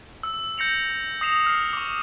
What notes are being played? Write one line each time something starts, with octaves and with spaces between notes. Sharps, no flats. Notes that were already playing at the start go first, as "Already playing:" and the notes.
E6
G6 A#6 C#7 F7
D#6 A#6 C7 E7 F7
F6 C7
C#6 D6